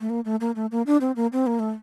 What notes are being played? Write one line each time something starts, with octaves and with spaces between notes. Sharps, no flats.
A3
A#3
A3
A#3
A3
A#3
D4
C4
A#3
C4
A#3
A3